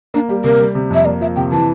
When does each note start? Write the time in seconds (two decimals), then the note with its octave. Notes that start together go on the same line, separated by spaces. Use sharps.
0.14 A#3 D4
0.29 G3 G4
0.44 C3 A#4
0.60 G3
0.75 C3
0.90 F2 E5
1.05 A#3 D5
1.21 F3 E5
1.36 C3 G5
1.52 E3 A5